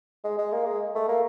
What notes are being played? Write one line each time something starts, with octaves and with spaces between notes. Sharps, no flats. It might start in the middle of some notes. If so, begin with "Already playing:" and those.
G#3
G#3
A#3
G#3
A3
A#3